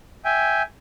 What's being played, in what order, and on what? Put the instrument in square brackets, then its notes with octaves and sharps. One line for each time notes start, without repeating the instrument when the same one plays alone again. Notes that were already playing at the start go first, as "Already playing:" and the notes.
[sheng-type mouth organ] E5 G5 G#5